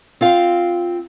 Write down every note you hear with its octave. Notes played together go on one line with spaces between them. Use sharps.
C4 F4 F5